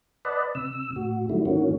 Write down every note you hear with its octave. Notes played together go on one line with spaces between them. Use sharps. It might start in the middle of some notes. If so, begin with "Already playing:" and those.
B4 D5 D#5 F#5 A5 B5
C3 E6
A2 F#4
D#3 F#3 G3 A3 E4
G#2 D#3 E3 A#3 C#4 F#4